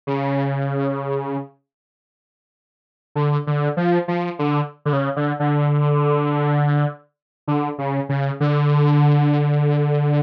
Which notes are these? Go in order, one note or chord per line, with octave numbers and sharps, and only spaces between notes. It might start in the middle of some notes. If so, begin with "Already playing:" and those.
C#3
D3
D3
F3
F3
D3
D3
C#3
D3
D3
D3
C#3
C#3
D3